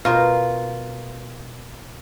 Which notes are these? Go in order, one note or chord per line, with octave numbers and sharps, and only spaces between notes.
B2 F4 A#4 C5